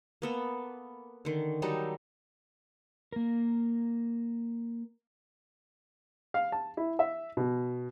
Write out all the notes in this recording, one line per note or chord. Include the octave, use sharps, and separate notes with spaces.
A#3 B3 A4
D3 D#3
F#3 G3 D#4 A4
A#3 A#4
F5
A5
E4
E5
B2